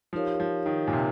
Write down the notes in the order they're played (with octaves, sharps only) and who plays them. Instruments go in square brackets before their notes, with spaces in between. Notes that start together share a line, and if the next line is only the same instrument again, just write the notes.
[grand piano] F3 [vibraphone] D#4 G4 A#4 C#5 F5
[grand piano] F3
D#3
A#2
C3